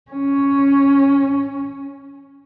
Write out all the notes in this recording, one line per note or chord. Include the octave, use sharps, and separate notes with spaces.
C#4